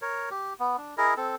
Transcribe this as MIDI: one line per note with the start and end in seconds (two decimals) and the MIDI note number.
0.02 0.29 70
0.02 0.29 73
0.31 0.54 67
0.60 0.77 59
0.78 0.95 62
0.97 1.14 64
0.97 1.14 68
0.97 1.14 70
0.97 1.14 75
1.17 1.35 60
1.17 1.35 69